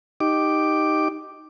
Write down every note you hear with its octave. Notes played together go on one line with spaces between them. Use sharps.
D#4 G4 D6